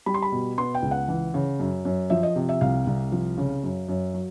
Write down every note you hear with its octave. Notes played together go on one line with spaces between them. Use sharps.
G3 B5
C6
B5
B2
B3 C6
G5
C#2
F#5
E3
C#3
F#2
F#2
F3 E5
D#5
C3
E5
C2 F5
C2
F3
C#3
F#2
F#2
F#3